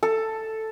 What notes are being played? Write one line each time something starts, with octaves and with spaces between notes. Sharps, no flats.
A4